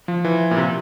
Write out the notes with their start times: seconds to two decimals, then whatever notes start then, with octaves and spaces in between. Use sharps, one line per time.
0.08 F3
0.25 E3
0.51 A#2
0.57 C3